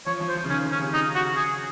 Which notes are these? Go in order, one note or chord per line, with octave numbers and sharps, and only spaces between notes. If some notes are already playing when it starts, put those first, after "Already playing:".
F3 C#5
F3
C5
F3
C#3
D#3 C#4
C#3
C#4
C3
C#3 D#4
F#4
C#3 G#4